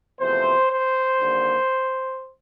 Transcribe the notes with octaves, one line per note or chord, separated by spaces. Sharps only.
E2 C3 F3 A3 C5
C5
D#2 D3 G3 A#3